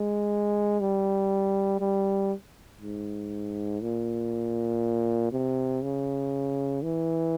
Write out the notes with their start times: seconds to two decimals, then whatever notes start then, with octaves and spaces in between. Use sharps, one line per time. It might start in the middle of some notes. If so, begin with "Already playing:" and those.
Already playing: G#3
0.80 G3
1.80 G3
2.81 G#2
3.82 A#2
5.32 C3
5.82 C#3
6.82 E3